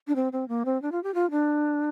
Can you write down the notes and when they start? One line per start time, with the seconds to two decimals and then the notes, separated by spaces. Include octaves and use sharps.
0.08 D4
0.16 C4
0.33 C4
0.48 A#3
0.65 C4
0.82 D4
0.92 F4
1.03 G4
1.14 F4
1.31 D4